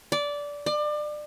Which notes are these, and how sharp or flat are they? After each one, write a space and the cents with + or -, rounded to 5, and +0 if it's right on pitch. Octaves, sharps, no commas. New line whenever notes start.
D5 -15
D5 +30